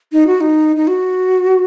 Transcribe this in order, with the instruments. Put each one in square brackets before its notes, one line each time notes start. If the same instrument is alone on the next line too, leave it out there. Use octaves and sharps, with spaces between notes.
[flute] D#4
F#4
D#4
D#4
F#4